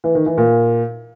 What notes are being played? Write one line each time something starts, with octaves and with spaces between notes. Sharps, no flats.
E3
D#3
E3
A#2